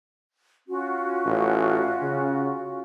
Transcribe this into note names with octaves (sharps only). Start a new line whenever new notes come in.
C#4 F4 F#4
A1
C#3